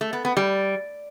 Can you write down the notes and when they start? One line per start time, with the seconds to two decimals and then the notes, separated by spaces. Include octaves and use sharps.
0.01 A3
0.13 B3
0.25 B3
0.37 G3